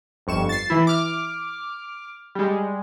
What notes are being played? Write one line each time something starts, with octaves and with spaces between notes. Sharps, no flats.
G1 F2 C#6 E7
A6 C7
E3 E4
D6 F6
G3 G#3